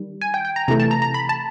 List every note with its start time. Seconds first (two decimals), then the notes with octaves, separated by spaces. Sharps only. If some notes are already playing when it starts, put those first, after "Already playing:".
Already playing: D#3 G3
0.21 G#5
0.34 G5
0.45 G5
0.56 A#5
0.68 C3 E3 A3 A#5
0.80 A5
0.91 A#5
1.02 A#5
1.14 B5
1.29 A5